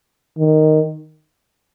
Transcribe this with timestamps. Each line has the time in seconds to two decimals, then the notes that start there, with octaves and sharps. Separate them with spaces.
0.39 D#3